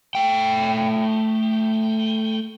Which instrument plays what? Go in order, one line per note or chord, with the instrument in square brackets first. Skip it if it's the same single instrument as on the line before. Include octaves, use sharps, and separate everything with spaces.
[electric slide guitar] A3 G5